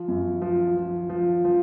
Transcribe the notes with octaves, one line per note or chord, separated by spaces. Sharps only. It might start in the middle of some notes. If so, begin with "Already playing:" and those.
Already playing: F3
F#2
F3
F3
F3
F3